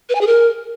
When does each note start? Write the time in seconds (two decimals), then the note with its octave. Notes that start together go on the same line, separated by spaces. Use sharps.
0.09 B4
0.15 G#5
0.21 G#4
0.27 A#4